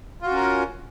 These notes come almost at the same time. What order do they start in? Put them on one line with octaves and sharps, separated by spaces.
F4 F#4 C#4 A#4